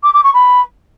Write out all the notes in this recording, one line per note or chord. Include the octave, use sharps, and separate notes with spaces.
D6
D6
C#6
B5